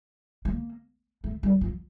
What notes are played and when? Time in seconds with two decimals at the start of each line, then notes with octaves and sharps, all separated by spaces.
0.45 A#3
1.24 A3
1.43 G3
1.61 F3